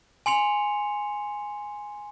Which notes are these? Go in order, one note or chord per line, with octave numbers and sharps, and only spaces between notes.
G#5 C6 C#7 F7